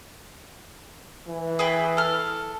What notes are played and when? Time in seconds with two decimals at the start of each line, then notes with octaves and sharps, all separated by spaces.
1.27 E3
1.59 G#4 B4 G5
1.97 A4 F6